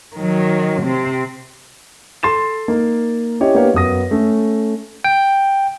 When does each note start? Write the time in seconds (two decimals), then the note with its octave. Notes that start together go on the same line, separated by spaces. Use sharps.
0.15 D#3 F#3
0.82 C3 C4
2.23 A4 C6 A6 E7
2.68 A#3 D#4
3.40 C#4 E4 G4 C#5 D#5
3.55 A#3 B3 D4 G4 C#5 F5
3.74 F#2 B3 D#6 A#6
4.11 A3 C#4 A4
5.04 G5